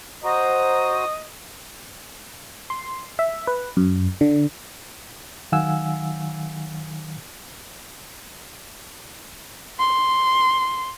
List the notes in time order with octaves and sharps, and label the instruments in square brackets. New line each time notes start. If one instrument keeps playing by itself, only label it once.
[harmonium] F#4 C5 A#5 [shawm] D#5
[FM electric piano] C6
E5
B4
F#2
D3
[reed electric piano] D#3 F#3 F5 F#5 G#5 E6
[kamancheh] C6